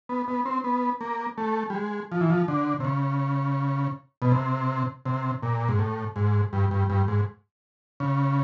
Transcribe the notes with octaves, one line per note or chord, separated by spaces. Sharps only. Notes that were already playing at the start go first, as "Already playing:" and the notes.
B3
B3
C4
B3
A#3
A3
G3
G#3
F3
E3
F3
D3
C3
C#3
B2
C3
C3
A#2
G#2
A2
G#2
G2
G2
G2
G#2
C#3